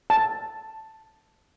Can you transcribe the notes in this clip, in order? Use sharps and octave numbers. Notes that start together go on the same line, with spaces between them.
A5